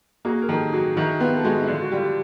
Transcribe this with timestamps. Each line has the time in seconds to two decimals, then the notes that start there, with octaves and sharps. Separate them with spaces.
0.25 A#3 F#4 G#4
0.42 A#4
0.49 D#3 G4 A4
0.72 F#3 F#4 G#4
0.96 D#3 E4 F#4
1.20 B3 F4 G4
1.37 A4
1.44 G#3 F#4 G#4
1.62 E4
1.68 D3 F4
1.82 F#4
1.92 G3 F4 G4